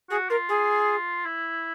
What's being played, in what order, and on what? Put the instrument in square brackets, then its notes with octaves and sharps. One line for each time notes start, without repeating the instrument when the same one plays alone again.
[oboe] F#4 [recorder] G#4
[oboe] F4 [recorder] A#4
[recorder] G#4
[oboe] E4